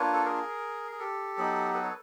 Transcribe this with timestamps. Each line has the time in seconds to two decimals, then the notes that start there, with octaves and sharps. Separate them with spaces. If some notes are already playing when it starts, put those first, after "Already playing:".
Already playing: A#3 D4 F4 B4 C#5
0.13 A4
0.25 G#4 A#4
0.92 G#4
0.99 G4 A4
1.37 F#3 B3 D#4
1.74 A4 B4
1.83 C#5